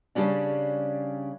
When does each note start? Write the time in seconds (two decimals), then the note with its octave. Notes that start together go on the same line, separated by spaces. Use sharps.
0.15 C#3 G3 C#4 D4